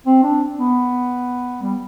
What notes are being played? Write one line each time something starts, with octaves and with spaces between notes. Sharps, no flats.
C4
D4
B3
G3